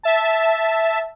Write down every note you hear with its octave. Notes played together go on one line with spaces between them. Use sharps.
E5 A5